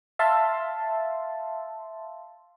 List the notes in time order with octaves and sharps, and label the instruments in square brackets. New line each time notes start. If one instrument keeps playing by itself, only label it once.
[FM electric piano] E5 F5 A5 C6